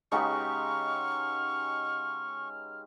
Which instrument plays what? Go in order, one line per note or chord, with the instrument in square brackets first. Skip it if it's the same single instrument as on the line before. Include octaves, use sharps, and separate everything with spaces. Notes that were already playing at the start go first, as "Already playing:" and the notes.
[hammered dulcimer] C#3 G#3 F#4 [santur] D#4 G4 B4 [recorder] C#6 [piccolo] F6